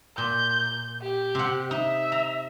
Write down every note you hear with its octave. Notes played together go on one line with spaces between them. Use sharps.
A#2 G6
G4
C3 F#5
D#4 E5
A#5